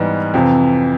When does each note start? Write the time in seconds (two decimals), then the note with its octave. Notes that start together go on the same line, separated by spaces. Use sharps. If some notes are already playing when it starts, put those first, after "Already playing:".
Already playing: G#2 E3 G3 B3 D#4
0.34 F2 C3 E3